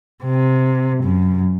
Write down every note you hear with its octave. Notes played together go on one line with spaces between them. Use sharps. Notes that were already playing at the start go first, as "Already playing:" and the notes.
C3
F#2